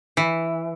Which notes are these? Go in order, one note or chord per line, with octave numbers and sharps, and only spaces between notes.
E3